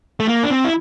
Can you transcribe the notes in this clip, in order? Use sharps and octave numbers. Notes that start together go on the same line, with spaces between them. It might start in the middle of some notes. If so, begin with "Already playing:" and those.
A3
A#3
D4
C4
E4